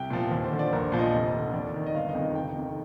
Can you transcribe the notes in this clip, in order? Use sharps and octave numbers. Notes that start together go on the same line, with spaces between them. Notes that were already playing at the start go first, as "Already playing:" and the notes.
Already playing: C2 G5
A#2 F3
D#2
C5
D3 F3
D5
A#1 A#4
A#2 F3
D#5
F1 D#5
D#2 D3
D#2 D5
D#3
D#5
G1 F5
D#5
F2 D#3
F1 G5
F2 C3 D#3